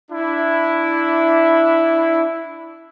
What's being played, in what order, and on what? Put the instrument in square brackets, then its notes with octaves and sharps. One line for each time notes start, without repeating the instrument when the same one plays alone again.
[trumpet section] D4 E4